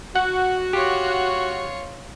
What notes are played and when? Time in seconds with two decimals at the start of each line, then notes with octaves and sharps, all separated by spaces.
0.16 F#4 F#5
0.73 F4 G4 C#5